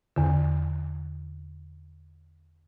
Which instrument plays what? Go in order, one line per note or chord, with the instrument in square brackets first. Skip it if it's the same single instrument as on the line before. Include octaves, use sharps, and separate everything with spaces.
[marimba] E2 D3